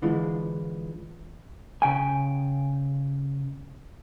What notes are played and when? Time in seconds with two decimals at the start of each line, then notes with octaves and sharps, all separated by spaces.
0.02 D3 E3 F3 G#3
1.82 C#3 G5 G#5